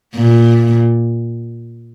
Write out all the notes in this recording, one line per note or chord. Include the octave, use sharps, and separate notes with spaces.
A#2